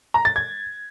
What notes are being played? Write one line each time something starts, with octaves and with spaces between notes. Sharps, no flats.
A#5
A6
G#6